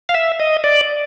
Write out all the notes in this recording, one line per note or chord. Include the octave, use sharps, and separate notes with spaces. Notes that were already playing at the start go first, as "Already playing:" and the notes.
F5
E5
D#5
D5